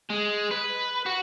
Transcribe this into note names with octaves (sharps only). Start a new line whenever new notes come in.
G#3
B4
F#4